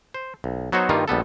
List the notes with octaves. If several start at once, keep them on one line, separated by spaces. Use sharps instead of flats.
C5
B1
F#3 B3 D#4 F#4 C5 C#5
G2 D#3 G3 A#3 D#4 F4
A#1 G3 B3 A4